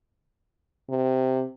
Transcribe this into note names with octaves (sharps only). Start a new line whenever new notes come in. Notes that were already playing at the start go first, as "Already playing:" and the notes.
C3